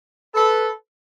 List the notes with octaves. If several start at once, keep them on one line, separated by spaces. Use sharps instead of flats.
A4 B4